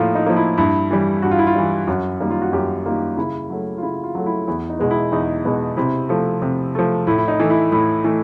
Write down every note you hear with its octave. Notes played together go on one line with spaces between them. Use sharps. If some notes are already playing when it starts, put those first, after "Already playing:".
Already playing: A2 F3 A#3 F4
D#4
F3 A#3
E4
G2 E4
E3 G3
G2 F#4
F4
E4
F4
E3 G3
F#2 F#4
D#3 G3 A#3
F4
F#4
F#2 G4
D#3 G3 A#3 F4
C#3 E4
F#3 A3
F4
C#3 E4
F4
F#3 A3
E4
E2 E4
D#4
B2 G#3 B3
E4
E2 D#4
B2 G#3 B3
C3 E4
F3 A3
C3
F3 A3
A2 E4
E4
D#4
E3 A3
E4
A2 E4
E3 A3